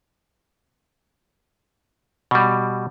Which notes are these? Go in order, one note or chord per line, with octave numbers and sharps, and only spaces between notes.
B2 G3